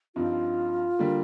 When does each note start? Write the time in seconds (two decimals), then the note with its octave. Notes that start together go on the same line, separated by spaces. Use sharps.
0.15 G2 F3 C4 D#4 F4
0.99 D3 G3 A#3